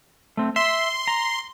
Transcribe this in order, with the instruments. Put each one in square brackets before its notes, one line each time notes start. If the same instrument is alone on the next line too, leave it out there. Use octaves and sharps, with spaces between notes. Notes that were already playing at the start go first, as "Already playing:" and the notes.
[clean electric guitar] A3 C4
[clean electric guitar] E5 [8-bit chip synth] C6
[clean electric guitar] A#5